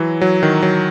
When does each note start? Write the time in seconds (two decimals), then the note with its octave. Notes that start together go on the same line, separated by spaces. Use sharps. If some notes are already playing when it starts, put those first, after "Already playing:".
Already playing: E3 F#3
0.21 F#3
0.43 D#3
0.62 F#3